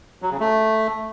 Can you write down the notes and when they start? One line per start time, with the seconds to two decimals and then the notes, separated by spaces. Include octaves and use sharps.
0.22 F#3
0.31 C#3
0.40 A3